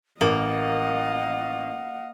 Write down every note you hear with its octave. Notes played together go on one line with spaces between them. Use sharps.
A1 A#3 D#5 F5 F#5